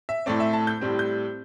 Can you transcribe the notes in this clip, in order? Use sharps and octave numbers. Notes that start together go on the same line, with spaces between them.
E5
A2 A3 C4 D5
E5
A5
G6
A2 G3 C4
G6